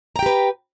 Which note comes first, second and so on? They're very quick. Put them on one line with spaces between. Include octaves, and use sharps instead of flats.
A#5 G5 G4 B4